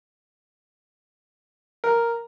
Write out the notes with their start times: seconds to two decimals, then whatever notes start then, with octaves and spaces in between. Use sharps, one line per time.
1.84 A#4